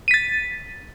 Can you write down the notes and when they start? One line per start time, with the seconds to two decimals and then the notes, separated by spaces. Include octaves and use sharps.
0.08 D#7
0.11 B6
0.14 A6